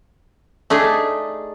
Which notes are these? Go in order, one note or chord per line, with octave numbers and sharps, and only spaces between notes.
A3 D4 D#4 G#4